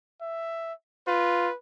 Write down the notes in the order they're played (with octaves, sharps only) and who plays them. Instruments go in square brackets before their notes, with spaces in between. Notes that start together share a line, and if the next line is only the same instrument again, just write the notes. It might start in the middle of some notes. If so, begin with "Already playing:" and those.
[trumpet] E5
[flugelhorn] F4 [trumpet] B4